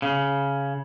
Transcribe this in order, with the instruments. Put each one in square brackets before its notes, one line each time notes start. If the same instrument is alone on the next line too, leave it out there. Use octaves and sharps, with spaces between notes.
[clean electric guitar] C#3